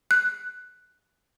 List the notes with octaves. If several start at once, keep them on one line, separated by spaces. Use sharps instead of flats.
F#6